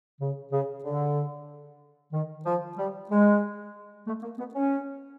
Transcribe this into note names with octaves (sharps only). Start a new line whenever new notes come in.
C#3
C#3
D3
D#3
F3
G3
G#3
A3
A#3
B3
C#4